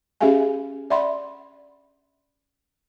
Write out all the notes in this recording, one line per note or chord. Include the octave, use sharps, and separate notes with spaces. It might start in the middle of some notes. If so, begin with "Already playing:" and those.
C#4 G4 G#4 E5 F5 G#5
D5 E5 F#5 B5 C6